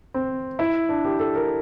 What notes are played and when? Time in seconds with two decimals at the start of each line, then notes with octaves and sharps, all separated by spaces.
0.14 C4
0.59 E4
0.89 D4
1.05 G4
1.20 A4
1.35 A#4